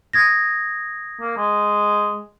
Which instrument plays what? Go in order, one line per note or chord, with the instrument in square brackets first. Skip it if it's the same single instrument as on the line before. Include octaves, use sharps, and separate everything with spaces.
[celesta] D#6 G#6 A#6
[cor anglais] A#3
G#3